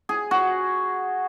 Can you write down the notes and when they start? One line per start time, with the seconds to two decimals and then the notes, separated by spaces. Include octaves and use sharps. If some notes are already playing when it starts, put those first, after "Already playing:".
0.09 G#4
0.31 F#4